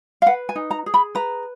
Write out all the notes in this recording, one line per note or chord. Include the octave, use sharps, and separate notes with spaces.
F5
B4 F#5
G#5
D#4
A#5
G#4
B5
B4 A#5